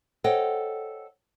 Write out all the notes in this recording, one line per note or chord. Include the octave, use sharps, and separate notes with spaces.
A4 C5 C#5 D#5 F#5 G5